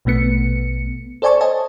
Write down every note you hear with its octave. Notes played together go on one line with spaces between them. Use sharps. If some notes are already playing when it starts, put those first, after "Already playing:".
A#1 B2 A3 B3 C#7
A4 C5 D5 G#5 A5 C#6
C5 C#5 D#5 G#5 A5